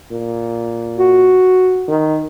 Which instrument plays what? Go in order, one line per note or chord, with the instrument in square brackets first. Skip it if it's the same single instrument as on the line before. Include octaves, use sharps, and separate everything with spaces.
[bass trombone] A#2
[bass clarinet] F#4
[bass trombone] D#3